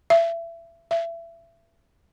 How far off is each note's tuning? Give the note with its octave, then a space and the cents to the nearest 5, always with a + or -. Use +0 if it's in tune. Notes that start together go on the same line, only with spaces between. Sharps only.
E5 +30
E5 +30